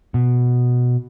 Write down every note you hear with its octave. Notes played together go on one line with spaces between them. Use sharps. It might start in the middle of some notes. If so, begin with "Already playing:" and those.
B2